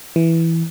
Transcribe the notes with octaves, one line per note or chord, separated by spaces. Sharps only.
E3